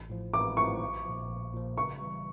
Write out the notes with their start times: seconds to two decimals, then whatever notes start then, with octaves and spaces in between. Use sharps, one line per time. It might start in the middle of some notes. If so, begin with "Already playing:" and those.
Already playing: A1
0.10 A2 F3
0.33 A1 D6
0.57 A2 F3 C#6
0.81 A#1
1.05 A#2 F3
1.29 A#1
1.53 A#2 F3
1.77 C#3 C#6
2.01 E3 G3